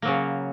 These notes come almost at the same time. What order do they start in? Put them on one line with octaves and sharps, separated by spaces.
A#3 F#3 C#3